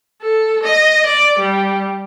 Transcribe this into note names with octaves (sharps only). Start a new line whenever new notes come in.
A4
D#5
D5
G3